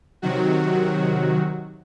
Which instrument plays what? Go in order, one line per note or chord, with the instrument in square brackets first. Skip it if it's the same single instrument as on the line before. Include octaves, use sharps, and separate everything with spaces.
[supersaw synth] C3 D#3 F#3 F#4